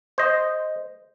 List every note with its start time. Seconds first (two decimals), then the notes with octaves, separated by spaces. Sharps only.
0.18 C5 D#5